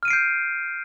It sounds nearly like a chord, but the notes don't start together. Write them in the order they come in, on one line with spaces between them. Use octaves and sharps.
F6 D#7 D7 C7 G6